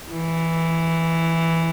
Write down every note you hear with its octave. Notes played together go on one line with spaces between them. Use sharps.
E3